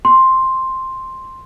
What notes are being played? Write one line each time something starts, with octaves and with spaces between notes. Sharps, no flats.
C6